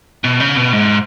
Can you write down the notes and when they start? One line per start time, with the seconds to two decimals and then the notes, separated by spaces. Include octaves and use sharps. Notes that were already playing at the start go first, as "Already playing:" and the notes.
0.24 B2
0.40 C#3
0.56 B2
0.73 G#2